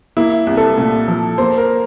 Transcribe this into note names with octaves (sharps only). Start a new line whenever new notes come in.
A#3 E4
C2
A4
A#2
F3
A#3 C5
A#4